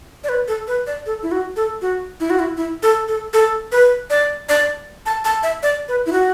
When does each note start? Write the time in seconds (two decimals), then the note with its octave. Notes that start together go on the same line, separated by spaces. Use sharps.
0.24 D5
0.29 B4
0.48 A4
0.68 B4
0.87 D5
1.06 A4
1.23 E4
1.31 F#4
1.56 A4
1.82 F#4
2.20 E4
2.30 F#4
2.39 E4
2.57 E4
2.83 A4
3.08 A4
3.33 A4
3.72 B4
4.10 D5
4.49 D5
5.06 A5
5.25 A5
5.43 E5
5.63 D5
5.88 B4
6.06 E4
6.13 F#4